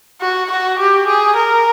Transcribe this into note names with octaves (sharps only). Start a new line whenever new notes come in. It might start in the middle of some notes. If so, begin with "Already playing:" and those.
F#4
F#4
G4
G#4
A#4